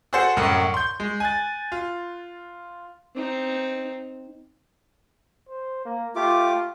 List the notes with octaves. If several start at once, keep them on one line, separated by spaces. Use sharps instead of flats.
F#4 G#4 A4 C5 F#5
C2 F#2 A2 A#4 F#5
C6 G6
G#3
G#5 F#6 A6
F4
C4 D#4
C5
A#3
A3 F4 G4 D6